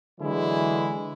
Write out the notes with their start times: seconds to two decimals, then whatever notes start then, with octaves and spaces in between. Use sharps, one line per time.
0.19 D3 E3 F#3 G#3 E4